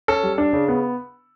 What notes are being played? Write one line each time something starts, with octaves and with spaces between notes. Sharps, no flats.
C#4 A4
G3
D4
C#3
B3